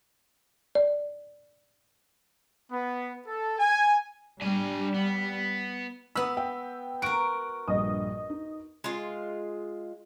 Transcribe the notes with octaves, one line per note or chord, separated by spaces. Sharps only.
D5
B3
A4
G#5
G3 D4 G#5
B3
B3 B5 E6
G5
F#4 A#4 D7
A#1 G2 D#5 D#6
D#4
G#3 F4